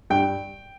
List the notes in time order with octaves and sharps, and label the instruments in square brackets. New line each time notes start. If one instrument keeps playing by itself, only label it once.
[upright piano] G2 G5